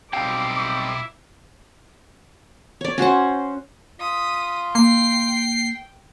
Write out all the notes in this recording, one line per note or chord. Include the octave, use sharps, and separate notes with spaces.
B1 G3 C4 D#4 E4 F5 G5 D6
C#5 D5
C#4 F#4 C5 F#5
F4 D#6 B6
A#3 G5 C7